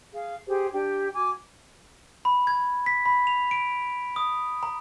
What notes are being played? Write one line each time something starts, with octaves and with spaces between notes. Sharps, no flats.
G#4 F5
G4 G#4 C5
D4 G4 G5
F#4 G#5 D6
B5
G#6
B6
B5
F7
D7
D#6
A#5